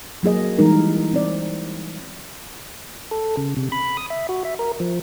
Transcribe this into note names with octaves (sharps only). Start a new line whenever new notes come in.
F#3 A#3 G#4 D#5
E3 G3 G#3 D#4 A#4
C4 D5
A4
C#3
C3
B5
D#6
E5
F#4
E5
A#4
F3